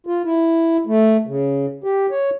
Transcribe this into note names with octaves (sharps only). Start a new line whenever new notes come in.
F4
E4
A3
C#3
G4
C#5